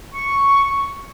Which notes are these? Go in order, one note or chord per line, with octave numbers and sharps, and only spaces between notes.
C#6